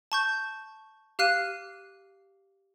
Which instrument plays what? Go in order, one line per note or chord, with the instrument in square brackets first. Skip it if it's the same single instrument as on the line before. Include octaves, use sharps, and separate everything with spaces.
[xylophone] A5 C#6 G6
G4 F5 F6 F#6 C7 D#7